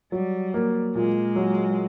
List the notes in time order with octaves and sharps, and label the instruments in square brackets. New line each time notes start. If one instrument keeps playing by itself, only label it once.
[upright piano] F#3 [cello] G3
[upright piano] A#3
[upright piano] A#2 [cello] G#3
[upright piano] F#3